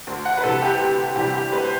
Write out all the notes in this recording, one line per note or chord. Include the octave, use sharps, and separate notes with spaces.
D2
F#5
B4
C3 E3 G3 A4
G4
D2
C3 E3 G3 G4
G4
D2 B4
C5